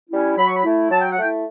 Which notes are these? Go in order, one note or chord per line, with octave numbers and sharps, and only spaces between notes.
G3 C#4 E4
F#3 B5
C#6
B5
A3 E4
F#3 A5
G5
F#5
A3 E4 G5